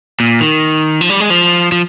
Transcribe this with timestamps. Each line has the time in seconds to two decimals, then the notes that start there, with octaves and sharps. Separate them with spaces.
0.20 A#2
0.41 D#3
1.01 F3
1.10 G3
1.20 G#3
1.30 F3
1.72 F3